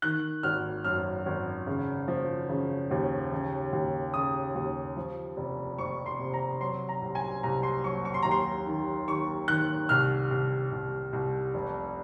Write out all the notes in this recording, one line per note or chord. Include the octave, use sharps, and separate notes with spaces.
D#3 F#6
G#1 F6
F#2 F6
G#1
C#3
F3
C#3
D#2
C#3
D#2
C#3 D#6
D#2
F3
F1
F2 C#6
C6
C3
A#5
F#3 C6
A#5
C2
G#5
C2 A#5
C6
F#3 C#6
C#6
C6
D#2 A#5
C6
D#3
D#3 C#6
D#3 F#6
C2 F6
C2
C2
C2
F1